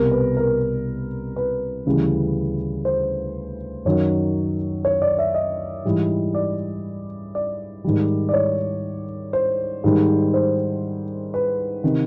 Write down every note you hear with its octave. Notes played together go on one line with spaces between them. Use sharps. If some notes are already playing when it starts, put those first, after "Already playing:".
Already playing: C2 B2 G3 A#4
B4
A#4
B4
D2 C#3 E3 G3
C5
F#2 D#3 F#3 C#5
C#5
D5
E5
D#5
G#2 E3 G3
D5
D5
G#2 D#3 G3
D5
C#5
C5
G#2 D#3 G3
C5
B4
C3 D#3